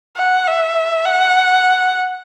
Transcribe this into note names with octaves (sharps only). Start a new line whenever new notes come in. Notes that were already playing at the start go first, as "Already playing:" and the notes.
F#5
E5
F#5